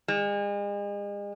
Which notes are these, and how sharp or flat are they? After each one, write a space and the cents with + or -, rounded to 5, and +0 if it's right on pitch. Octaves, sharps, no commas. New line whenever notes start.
G#3 -40